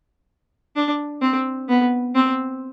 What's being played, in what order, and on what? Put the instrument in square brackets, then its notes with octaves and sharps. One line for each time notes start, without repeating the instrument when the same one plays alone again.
[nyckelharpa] D4
C4
B3
C4